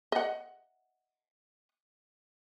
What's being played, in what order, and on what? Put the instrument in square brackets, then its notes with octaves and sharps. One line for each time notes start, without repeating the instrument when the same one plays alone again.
[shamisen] D#5 F#5